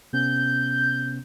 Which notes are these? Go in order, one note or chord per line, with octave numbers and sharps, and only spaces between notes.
C3 B3 C#4 G6